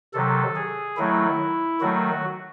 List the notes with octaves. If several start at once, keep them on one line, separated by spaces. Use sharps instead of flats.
C3 D#3 F#3 A4
G#4
D#3 F#3 A3 E4
D#3 F#3 A3 F#4